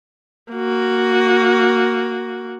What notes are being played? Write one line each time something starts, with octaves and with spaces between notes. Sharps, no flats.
A#3 F#4